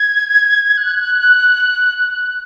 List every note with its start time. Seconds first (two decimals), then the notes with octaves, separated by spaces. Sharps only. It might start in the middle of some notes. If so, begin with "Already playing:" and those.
Already playing: G#6
0.77 F#6